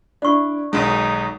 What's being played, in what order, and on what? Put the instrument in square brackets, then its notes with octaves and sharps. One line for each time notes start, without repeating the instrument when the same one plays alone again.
[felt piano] D4 E4 [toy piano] D5 C#6
[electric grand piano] B1 G#3 [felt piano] D#3 F#3 [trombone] D#4